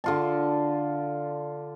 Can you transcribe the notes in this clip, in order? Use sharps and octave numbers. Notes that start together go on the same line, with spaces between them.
D3 F4 A5